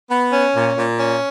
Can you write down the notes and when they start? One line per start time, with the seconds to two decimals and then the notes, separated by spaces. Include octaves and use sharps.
0.10 B3
0.32 C#4
0.54 A#2
0.76 A#2
0.98 C#4